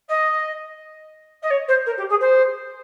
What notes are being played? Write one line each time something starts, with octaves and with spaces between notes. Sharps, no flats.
D#5
D#5
C#5
C5
A#4
G4
G#4
C5